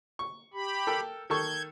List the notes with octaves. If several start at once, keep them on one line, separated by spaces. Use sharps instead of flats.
C#6
G4 B5
A4 A#4 G5
D#3 A4 C#6 G6 G#6